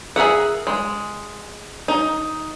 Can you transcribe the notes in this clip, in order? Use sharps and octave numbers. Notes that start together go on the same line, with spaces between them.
G#4 A#4 E5 F#5
G#3
D#4